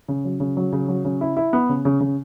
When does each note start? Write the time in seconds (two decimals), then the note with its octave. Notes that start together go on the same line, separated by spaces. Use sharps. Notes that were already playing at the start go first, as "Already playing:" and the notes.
0.08 C#3
0.25 F#3
0.40 C#3
0.57 F#3
0.73 C#3
0.88 F#3
1.05 C#3
1.21 E4
1.37 E4
1.53 B3
1.69 C#3
1.85 C#3
2.00 C#3